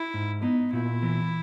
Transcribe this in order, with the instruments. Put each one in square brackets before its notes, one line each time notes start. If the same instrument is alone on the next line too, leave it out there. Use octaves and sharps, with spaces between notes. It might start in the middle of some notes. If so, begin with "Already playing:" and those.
Already playing: [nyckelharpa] E4
[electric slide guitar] G#2
[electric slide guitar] B3 [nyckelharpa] D#4
[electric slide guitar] A#2 [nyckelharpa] E4
[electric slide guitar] E3